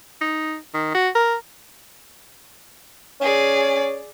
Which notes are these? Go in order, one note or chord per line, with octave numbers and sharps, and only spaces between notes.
D#4
D#3
F#4
A#4
C#4 G#4 D5